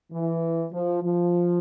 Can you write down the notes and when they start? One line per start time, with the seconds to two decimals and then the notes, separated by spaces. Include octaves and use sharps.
0.13 E3
0.72 F3
1.03 F3